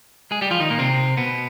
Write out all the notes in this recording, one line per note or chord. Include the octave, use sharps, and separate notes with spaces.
G#3 G#4
G3 G4
F3 F4
D#3 D#4
A#2 A#3
C3 C4
B2 B3